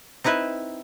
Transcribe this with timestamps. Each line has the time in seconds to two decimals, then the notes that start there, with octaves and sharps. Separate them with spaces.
0.24 C4 D#4 E4 B4 E5